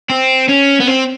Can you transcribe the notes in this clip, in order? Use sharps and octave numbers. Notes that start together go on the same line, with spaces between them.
C4
C#4
B3
C4